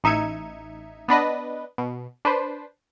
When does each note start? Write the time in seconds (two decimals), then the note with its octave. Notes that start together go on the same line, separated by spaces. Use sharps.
0.04 A1 D#4 E5 G#6 C#7
1.08 B3 D4 B4 D#5
1.78 B2
2.25 D4 B4 C5